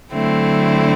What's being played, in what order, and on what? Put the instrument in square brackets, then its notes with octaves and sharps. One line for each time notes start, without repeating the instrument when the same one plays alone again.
[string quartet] D3 F#3 A3 C4 E4